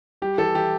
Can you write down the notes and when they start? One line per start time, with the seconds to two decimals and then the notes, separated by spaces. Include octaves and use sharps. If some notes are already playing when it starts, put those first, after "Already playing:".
0.22 G3 G4
0.38 E3 A4
0.55 E3 G4